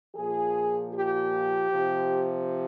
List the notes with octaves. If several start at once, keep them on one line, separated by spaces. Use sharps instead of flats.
A#2 F3 G#4
G4
C3 F3